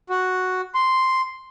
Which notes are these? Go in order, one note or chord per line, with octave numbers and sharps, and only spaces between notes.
F#4
C6